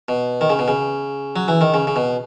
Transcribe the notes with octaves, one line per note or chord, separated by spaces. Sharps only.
B2
D#3
C#3
B2
C#3
F#3
E3
D#3
C#3
C#3
B2